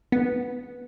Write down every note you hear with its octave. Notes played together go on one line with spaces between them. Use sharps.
B3